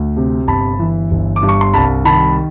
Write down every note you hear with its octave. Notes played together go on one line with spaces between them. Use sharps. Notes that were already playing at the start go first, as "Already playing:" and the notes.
Already playing: D2
C3
G1 A5 B5
E3
G1
D6
G2
C#6
C6
C2 A5 B5
D#3 A5 B5